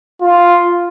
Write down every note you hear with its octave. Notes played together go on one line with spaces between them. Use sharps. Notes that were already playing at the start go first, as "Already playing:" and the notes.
F4